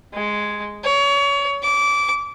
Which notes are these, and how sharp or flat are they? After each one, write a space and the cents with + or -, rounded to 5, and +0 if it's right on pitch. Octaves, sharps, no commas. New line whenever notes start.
G#3 +5
C#5 +30
D6 -20